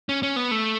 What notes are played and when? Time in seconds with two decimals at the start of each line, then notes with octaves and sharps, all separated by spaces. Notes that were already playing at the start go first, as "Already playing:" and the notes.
0.09 C#4
0.23 C#4
0.36 B3
0.51 A3